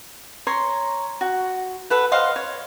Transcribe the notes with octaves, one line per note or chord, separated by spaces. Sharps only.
C#5 A#5 C6
F#4
A4 B4 F#5
C5 D#5 F5 F#5
C#5